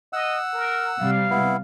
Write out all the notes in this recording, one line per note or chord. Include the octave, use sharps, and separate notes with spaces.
D#5 F#5 E6
A#4
C3 G3 F5
B3 E4